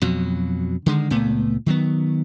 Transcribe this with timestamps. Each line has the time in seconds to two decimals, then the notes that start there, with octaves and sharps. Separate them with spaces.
0.02 F2 B2 F#3
0.86 D3 D#3 G#3
1.10 C#2 A#2 A3 B3
1.66 D#3 F#3 B3